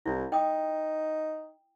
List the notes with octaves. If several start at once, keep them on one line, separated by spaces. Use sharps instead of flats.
C2 E4
D#4 G5 D#6